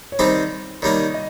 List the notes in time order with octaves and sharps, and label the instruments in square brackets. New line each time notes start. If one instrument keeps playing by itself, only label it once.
[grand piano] C#5
[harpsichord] D#3 G3 C4 D#4 G4 [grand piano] C5
[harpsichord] D#3 G3 A#3 D#4 [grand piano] C#5
[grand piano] D#5